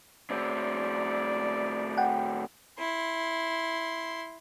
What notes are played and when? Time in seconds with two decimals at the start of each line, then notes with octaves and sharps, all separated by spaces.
0.30 A2 C4 D5
1.97 F#5 G5
2.79 E4 C6